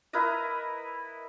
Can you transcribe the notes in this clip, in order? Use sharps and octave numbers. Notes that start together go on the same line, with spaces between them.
E4 A#4 B4 D#5